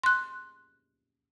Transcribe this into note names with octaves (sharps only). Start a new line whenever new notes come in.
C6 F#6